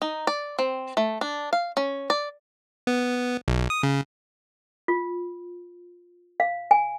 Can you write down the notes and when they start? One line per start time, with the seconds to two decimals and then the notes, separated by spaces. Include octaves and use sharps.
0.02 D#4
0.27 D5
0.59 C4
0.97 A3
1.21 D4
1.53 F5
1.77 C#4
2.10 D5
2.87 B3
3.48 B1
3.70 D#6
3.83 C#3
4.88 F4
6.40 F5
6.71 G#5